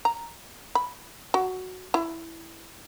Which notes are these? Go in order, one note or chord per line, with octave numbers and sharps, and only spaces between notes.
A#5
B5
F#4
E4